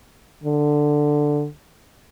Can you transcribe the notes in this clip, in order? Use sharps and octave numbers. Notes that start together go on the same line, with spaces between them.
D3